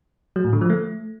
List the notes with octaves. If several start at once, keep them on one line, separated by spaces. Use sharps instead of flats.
F#3
A2
D3
F3
A3